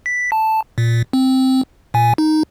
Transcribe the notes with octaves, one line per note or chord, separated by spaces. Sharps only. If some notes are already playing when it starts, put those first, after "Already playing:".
B6
A5
A#2
C4
A#2 G#5
D#4